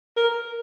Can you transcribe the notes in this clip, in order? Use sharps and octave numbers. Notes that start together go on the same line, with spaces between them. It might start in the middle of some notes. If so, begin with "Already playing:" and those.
A#4